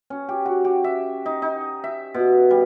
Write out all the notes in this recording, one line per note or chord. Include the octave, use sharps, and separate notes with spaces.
C#4
G4
F#4
G4
E5
D#4
D#4
E5
B2
G3